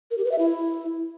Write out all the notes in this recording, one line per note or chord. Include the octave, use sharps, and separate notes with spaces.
A#4
G4
B4
E5
E4